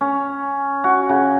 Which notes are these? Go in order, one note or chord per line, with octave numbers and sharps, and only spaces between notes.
C#4
F#4
C#3